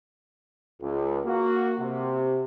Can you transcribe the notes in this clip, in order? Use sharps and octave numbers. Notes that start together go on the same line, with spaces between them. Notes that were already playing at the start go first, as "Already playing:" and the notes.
C#2
A#3 F#4
C3